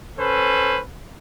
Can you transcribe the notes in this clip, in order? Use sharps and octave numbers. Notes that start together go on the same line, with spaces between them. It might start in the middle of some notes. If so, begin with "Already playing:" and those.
C#4 A4 B4 C5